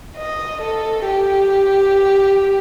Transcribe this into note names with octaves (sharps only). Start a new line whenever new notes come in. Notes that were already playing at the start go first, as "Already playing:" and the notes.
D#5
A4
G4